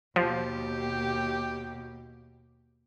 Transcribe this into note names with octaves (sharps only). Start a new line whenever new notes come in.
D#2 B2 F3 G4